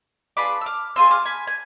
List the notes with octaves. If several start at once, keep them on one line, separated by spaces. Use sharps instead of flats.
B3 D4 F4 G#4 B5 D6
E6
D6 F6
C4 F4 G#4 C6 E6
D6 F6
G#5 B5
G#5